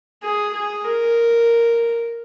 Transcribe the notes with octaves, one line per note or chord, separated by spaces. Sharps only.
G#4
G#4
A#4